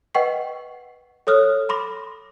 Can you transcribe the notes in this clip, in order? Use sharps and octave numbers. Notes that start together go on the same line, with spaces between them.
B4 D#5 F#5 G5 C#6 C7
A4 C#5 D#6 F6 F#6
B5 C6 D6 A#6